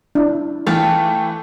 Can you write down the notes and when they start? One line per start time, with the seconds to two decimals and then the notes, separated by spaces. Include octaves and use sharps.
0.15 D4 E4
0.67 E3 A3 F5 G5 A5